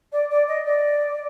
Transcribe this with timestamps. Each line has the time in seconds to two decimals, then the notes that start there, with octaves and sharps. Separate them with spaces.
0.12 D5
0.29 D5
0.48 D#5
0.65 D5